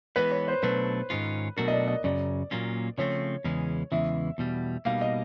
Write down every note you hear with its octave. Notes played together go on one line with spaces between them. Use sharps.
E3 G#3 B3 B4
C#5
C5
B2 F#3 A3 D4 B4
G#2 D#3 G#3 C#4 F4
B2 F#3 A3 D4 F#4 A#4
D#5
D5
D#5
F#2 C#3 F#3 D5
A#2 F#3 A#3 C#4 F4
C#3 F3 A3 C4 C#5
E2 C#3 E3 G#3 C#4
E2 C#3 E3 G#3 E5
E2 B2 G3
B2 G3 A#3 D#4 F5
D#5